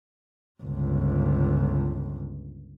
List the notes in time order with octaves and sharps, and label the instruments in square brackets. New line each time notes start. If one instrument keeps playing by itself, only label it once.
[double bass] G1 C#2